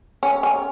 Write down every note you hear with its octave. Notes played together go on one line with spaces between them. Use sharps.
C#4
C#4